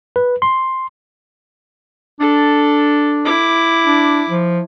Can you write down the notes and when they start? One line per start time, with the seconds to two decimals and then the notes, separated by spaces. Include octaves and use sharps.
0.16 B4
0.42 C6
2.20 D4 A4
3.25 E4 D6
3.86 D4
4.30 F3